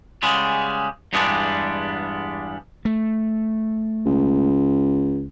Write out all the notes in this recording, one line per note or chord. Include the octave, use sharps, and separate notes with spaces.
C#3 G3 G#3 B3
E2 G2 G3 G#3 B3 D4
A3
C#2